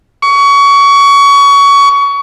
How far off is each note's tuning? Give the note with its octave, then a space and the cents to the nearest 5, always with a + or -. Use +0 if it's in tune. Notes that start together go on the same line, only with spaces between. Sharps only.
C#6 +25